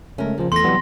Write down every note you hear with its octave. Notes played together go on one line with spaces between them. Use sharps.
C#3 G#3 A3 C#4 A#4
A#2 C#3 F3 A#3
E2 E3 A3 F4 C6 A#6
C3 E3 F#3 G3 B3